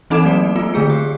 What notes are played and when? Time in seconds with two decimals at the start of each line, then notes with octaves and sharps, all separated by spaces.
0.10 E3 C4 D#4 A4 D6 E7
0.25 F#3 A3 A#3 D5
0.56 B3 F4
0.74 D3 A3 G#4 C#7
0.90 G4